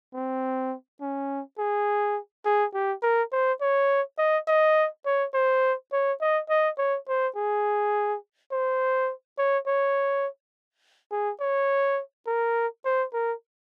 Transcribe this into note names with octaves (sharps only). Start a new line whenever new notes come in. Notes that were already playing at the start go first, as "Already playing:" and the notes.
C4
C#4
G#4
G#4
G4
A#4
C5
C#5
D#5
D#5
C#5
C5
C#5
D#5
D#5
C#5
C5
G#4
C5
C#5
C#5
G#4
C#5
A#4
C5
A#4